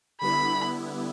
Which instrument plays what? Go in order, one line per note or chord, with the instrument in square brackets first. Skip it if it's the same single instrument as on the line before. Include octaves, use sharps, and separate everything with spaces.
[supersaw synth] D3 G3 B3 E4 [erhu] B5